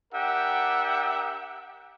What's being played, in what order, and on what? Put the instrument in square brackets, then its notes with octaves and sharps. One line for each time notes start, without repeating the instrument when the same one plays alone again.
[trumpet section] D4 G4 A#4 E5 F#5 G5